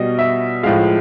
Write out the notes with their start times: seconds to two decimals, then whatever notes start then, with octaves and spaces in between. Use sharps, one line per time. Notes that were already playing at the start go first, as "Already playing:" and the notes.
Already playing: B2 G3 D#5
0.19 E5
0.63 A2 F3 G#3 F5